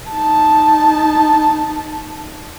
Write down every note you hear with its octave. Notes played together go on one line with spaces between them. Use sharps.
D#4 A5